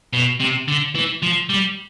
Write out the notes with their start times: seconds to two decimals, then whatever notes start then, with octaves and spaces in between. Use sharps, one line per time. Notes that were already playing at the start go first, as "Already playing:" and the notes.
0.13 B2
0.40 C3
0.68 D3
0.95 E3
1.22 F3
1.49 G3